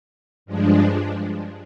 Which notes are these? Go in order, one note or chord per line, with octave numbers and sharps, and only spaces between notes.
G2 F3 G#3 D4